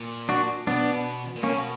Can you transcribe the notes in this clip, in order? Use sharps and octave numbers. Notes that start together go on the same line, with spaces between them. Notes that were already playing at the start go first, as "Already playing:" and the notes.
Already playing: A#2
D4 F#4
B2 B3 D4
A#2
B2 A#3 C#4